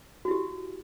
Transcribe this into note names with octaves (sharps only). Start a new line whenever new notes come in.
E4 F#4 G4